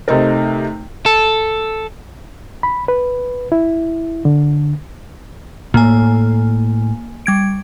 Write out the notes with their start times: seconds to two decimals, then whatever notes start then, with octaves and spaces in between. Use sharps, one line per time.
0.08 C3 A3 C4 D#4 A#4
1.06 A4
2.63 B5
2.88 B4
3.52 E4
4.25 D3
5.74 A2 A#3 G#5
7.26 G3 G#6 D7